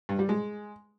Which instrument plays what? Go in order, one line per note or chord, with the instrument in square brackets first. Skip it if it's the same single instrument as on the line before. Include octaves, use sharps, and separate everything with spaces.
[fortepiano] G2
G3
G#3